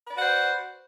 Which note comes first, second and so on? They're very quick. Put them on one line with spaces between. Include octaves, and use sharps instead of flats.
B4 D5 F#4 F#5 C5